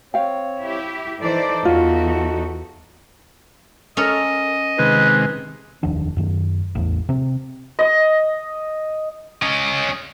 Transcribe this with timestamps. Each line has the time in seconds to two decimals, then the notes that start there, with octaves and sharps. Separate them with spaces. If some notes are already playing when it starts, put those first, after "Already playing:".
0.14 C4 C#5 F5 G5
0.60 E4 G4
1.20 E3 D#4 A4 C5 D5
1.65 E2 F4 F#4
3.97 C#4 A4 A#4 D#5
4.78 C3 D#3 G#3 B4
5.83 F1 D#2 D#3 D4
6.17 F#2 D#3
6.75 A1 E2
7.09 C3 C4
7.79 D#5
9.42 C#4 D#5